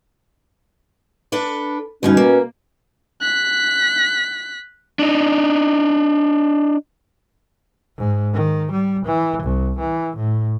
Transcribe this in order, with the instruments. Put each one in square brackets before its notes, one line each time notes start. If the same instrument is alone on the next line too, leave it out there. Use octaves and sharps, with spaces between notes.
[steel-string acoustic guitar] D4 A4 B4
[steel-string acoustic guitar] D2 G2 D#4 [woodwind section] B2 C#4
[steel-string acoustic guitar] A#3
[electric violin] F#6 B6
[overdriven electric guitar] D4 D#4
[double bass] G#2
D#3
G3
E3
C2
E3
A2